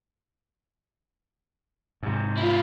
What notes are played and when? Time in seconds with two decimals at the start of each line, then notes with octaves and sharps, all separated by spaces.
2.03 G#2 C3
2.37 E4 F4